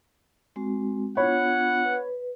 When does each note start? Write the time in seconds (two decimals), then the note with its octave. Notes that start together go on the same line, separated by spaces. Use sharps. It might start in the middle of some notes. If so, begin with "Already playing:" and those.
0.56 G#3 C4 F#4
1.17 B3 D4 F4 C#5 F#5 B5
1.85 B4